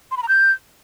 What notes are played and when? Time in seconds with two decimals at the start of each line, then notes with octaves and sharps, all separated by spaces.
0.11 C6
0.17 B5
0.23 A#5
0.28 G6